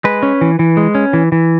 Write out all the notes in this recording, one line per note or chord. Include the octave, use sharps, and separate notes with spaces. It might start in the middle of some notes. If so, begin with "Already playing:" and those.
G#3 B4
C#4
E3
E3
G#3
C#4
E3
E3